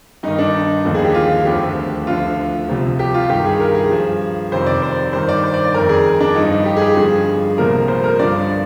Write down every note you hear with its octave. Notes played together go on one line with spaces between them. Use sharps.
G2 D#3 D#4
D4
D#4
D#2 D3 F3
G#4
G4
F4
D2 D3 F3 G4
D2 D3 F3 F4
C2 C3 F3
G4
F4
G2 D#3 G4
G#4
A#4
G#4
G2 F3
F2 C3 D#3 C5
D5
C5
G2 D#3 C5
D5
C5
D5
D5
F2 D#3 A#4
G#4
D4
G2 F3 D#4
G4
G#4
G4
G2 D3 F3 G#4
C2 A#2 F3 A#4
C5
A#4
G2 D3 F3 D5